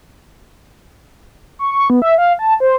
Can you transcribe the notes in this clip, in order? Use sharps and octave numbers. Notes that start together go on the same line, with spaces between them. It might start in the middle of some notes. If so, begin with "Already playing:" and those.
C#6
C#6
B3
E5
F5
A5
C5